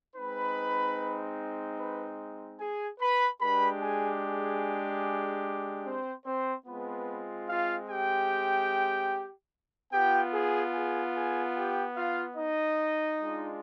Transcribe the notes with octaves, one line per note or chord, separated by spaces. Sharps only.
G#3 C4 D#4 B4 B5
B4 B5
G#4 G#5
B4 B5
G#3 D4 G4 B4 B5
G#4 G#5
G#4 G#5
C4 C5
C4 C5
G#3 B3 C4 F4 B4
F4 F5
G4 G5
B3 F4 G4 G5
G#4 G#5
G#4 G#5
G#4 G#5
G4 G5
F4 F5
D#4 D#5
G#3 D4 F4